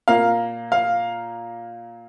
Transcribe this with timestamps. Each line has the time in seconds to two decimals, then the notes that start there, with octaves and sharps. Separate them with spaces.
0.08 A#2 A#3 F5
0.72 F5